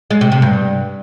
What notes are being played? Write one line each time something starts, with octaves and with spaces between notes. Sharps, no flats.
G#3
C3
C3
G2